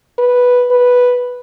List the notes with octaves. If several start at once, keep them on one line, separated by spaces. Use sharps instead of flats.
B4
B4